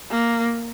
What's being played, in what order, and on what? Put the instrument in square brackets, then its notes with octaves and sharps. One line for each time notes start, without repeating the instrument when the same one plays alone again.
[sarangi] A#3